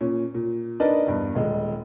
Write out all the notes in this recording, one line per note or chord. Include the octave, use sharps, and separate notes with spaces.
A#2 C#4
A#2
D4 D#4 A#4 B4 D5 D#5
E2 G2
D#1 G#3